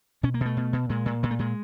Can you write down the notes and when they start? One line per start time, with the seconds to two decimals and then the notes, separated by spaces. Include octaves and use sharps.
0.23 B2 C#4
0.34 A#3
0.41 B2 A3
0.57 B2
0.73 B2
0.89 A#2 G#3
1.06 A#2
1.23 A#2 G#3
1.31 A3
1.39 A#2 G#3